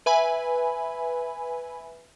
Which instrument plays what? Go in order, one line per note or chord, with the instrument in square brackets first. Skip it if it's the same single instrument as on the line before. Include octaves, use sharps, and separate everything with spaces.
[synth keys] B4 E5 G#5 B5